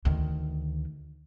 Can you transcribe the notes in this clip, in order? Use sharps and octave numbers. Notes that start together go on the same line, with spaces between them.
D2 D#3